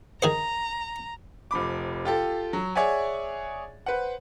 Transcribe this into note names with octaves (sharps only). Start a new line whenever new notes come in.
D#3 G#4 C5 A#5
F1 F3 B5 D6
F4 G4 A4
F#3
G#4 C#5 D5 E5 F#5 G#5
B4 C5 F#5